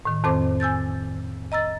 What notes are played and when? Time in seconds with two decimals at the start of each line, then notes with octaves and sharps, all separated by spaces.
0.05 A2 D#3
0.24 F2 D#3 C4 A4 C5 D6
0.60 G#5 E6 G6 A6
1.52 D#5 A#5 E6 A6